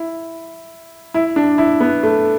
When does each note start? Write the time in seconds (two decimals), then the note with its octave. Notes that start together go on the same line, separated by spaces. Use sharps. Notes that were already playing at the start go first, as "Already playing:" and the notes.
Already playing: E4
1.14 E4
1.36 D4
1.58 E4
1.80 B3
2.03 A3